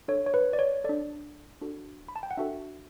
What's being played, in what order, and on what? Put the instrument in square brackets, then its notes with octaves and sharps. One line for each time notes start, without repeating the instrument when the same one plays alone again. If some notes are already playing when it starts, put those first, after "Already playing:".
[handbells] D4 A4 C#5
C#5
B4
D5
C#5
D4 A4 D5
D4 F#4 A4
B5
A5
G5
F#5
D4 F#4 A4 E5